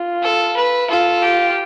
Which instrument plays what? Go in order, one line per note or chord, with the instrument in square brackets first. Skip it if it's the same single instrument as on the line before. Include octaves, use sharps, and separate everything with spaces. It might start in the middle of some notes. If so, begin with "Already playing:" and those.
Already playing: [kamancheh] F4
[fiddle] A4
B4
[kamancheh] F4 [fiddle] A4
[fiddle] G4